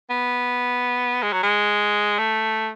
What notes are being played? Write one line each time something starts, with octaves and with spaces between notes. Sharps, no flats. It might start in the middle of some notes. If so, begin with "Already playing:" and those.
B3
G#3
F#3
G#3
A3